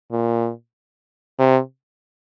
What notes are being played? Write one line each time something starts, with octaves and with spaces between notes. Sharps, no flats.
A#2
C3